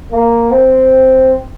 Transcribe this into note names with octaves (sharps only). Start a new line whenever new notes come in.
A#3
C4